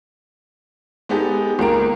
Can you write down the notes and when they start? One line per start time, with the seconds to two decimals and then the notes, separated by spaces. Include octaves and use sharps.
1.09 G#3 B3 D#4 G4 A4
1.59 C#2 A#3 A#5 D7